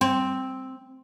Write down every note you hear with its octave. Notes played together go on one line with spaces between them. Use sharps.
C4